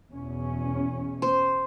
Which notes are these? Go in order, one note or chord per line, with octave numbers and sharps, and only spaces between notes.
E2 B2 C#4
C5